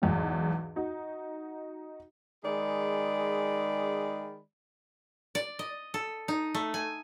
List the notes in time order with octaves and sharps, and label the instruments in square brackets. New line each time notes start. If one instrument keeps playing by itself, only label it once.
[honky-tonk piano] B1 E2 G#2
D#4 F#4
[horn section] D#3 G#3 G#4 D5 B5
[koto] D5
D#5
A4
D#4
A3
G#5